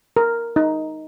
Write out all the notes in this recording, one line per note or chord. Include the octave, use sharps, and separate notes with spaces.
A#4
D#4